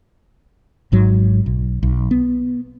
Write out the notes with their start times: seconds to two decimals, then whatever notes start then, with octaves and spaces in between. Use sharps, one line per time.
0.92 G#1 G#2 F#3
1.46 B1
1.83 B1
2.11 B3